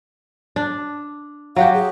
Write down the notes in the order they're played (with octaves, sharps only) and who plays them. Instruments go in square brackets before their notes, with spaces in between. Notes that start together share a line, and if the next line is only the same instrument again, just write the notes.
[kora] D4
[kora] F#3 F#4 G4 [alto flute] F5
[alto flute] G#4